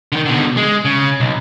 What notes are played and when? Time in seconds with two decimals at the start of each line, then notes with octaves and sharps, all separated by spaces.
0.12 D3 D#3
0.26 B2 D3
0.57 G#3
0.85 C#3
1.20 B1